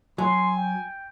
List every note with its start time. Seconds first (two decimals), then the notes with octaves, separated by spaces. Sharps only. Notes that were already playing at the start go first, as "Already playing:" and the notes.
0.18 F#3 G#5 C6
0.56 G5